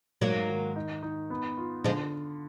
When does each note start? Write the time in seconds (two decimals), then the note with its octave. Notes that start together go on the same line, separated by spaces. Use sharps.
0.21 G#2 F#3 A#3
0.49 D#3
0.76 D#4
1.03 D#4
1.30 B3
1.57 F4
1.84 D3 F3 G#3